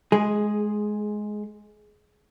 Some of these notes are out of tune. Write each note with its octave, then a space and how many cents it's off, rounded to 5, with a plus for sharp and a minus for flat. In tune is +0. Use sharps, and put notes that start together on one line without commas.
G#3 +15 G#4 +0